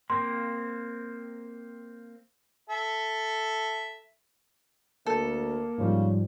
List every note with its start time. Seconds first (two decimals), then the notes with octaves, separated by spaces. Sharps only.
0.10 A#3 C4 C6
2.69 A4 E5
5.06 D2 A#3 A4
5.78 G#2 C#3 F3 G3